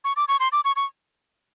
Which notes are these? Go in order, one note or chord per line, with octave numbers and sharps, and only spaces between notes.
C#6
D6
C#6
C6
D6
C#6
C#6